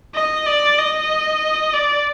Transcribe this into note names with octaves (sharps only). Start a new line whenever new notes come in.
D#5
D5
D#5
D5